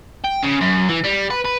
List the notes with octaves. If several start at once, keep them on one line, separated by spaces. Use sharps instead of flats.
G5
C#3
F#2
E3
G3
B4
B4